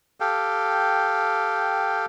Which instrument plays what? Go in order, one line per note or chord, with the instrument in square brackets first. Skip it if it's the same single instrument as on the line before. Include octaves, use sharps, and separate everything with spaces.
[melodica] G4 A4 F5 G5